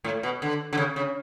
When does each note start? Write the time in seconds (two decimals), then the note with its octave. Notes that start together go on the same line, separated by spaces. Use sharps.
0.04 A2
0.23 B2
0.42 D3
0.73 D3
0.77 C#3
0.96 C#3